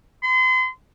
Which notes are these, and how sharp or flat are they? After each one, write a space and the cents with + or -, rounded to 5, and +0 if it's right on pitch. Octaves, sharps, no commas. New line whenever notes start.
C6 -40